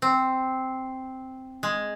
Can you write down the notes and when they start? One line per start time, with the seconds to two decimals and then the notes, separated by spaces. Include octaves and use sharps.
0.02 C4
1.63 G#3